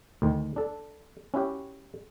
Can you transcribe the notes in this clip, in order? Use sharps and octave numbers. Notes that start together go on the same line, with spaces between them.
D2 D#3
D4 A4
C#4 E4 F#4 G4